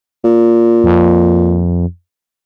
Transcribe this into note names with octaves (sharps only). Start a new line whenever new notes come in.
A#2
F2